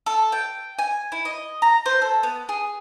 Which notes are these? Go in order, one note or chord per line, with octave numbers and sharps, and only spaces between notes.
A4
G5
G#5
E4
D#5
A#5
C5
A4
B3
G#4